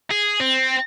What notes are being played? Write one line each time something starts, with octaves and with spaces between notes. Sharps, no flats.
G#4
C4